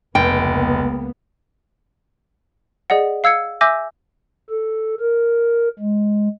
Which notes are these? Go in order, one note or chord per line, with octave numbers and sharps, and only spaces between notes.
F1 C#2 A#3 B3 G5
G#4 D5 D#5 F#5
F5 E6 G#6 C#7
E5 G#5 D6 E6 G6 A#6
A4
A#4
G#3